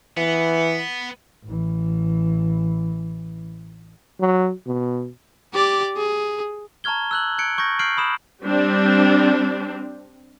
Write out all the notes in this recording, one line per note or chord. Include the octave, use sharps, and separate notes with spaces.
E3 B3
A1 E3
F#3
B2
G4 D5
G#4
A5 A#5 C#6 F6 G#6 G7
E6 F#6 F#7
F#6 G#6 C#7 D7
C#6 G6 G#6 A#6
F6 G6 C7 D7 F#7
B5 D#6 E7
G3 C4 D4